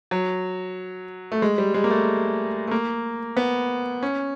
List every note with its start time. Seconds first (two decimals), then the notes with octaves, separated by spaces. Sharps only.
0.11 F#3
1.32 A3
1.42 G#3
1.58 G3
1.74 G#3
1.84 A#3
1.90 A3
2.67 A3
2.71 A#3
3.37 B3
4.03 C#4